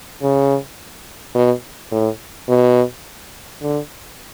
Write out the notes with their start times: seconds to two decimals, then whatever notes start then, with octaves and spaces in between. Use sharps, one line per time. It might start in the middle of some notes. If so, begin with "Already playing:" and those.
0.22 C#3
1.35 B2
1.92 A2
2.49 B2
3.62 D3